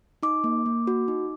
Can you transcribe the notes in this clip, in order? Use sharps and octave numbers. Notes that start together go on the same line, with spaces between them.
D#4 D6
A#3
A#3
F#4
D#4